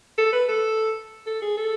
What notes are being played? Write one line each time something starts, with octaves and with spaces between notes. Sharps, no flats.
A4
B4
A4
A4
G#4
A4